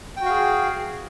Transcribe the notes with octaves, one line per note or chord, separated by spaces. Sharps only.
F#4 G#4 F5 G5